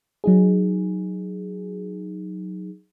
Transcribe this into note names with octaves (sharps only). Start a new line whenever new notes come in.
F#3 D#4 G#4